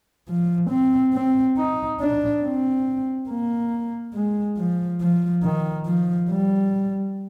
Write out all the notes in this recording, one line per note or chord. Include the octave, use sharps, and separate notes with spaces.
F3
C4
C4
D#4
D4
C4
A#3
G#3
F3
F3
D#3
F3
G3